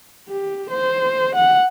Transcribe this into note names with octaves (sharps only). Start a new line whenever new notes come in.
G4
C5
F#5